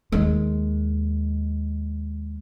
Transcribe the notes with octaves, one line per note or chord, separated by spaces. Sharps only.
D#2 G#3